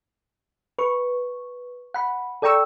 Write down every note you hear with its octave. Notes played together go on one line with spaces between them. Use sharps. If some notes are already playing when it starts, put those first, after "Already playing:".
B4 C#6
F#5 B5
A4 D5 G5 A#5 C#6 E6